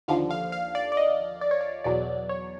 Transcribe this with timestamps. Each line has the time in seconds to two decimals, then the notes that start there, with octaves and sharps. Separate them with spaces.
0.08 D#2 D3 F3 F5
0.31 F5
0.52 F5
0.75 D5
0.92 D5
0.97 D#5
1.41 D5
1.51 C#5
1.61 D5
1.84 E2 B2 F#3 D5
2.29 C#5